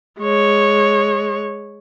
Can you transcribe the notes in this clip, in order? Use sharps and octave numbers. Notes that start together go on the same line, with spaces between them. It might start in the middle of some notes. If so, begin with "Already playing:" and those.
G#3 C#5